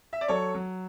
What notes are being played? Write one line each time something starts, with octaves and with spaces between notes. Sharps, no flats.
E5
D5
F#3 A4 C#5
F#3